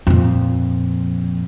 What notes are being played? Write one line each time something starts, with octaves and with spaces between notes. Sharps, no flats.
F2 A#2